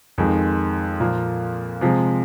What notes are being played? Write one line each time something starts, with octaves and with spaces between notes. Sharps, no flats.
F2 D#3 G#3
A#2 F3 A#3
C3 F3 G#3